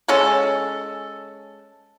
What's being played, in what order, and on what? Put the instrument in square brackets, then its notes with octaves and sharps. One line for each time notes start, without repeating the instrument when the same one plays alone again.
[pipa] G#3 C#4 A4